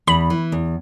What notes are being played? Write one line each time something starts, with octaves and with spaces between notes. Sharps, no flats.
E2 B5
E3
E2